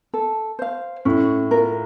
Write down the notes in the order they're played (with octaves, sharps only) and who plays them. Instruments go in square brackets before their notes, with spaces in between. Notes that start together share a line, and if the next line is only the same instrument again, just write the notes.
[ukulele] A4
C5 F5
[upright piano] A2 [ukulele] C#4
[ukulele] F4 A#4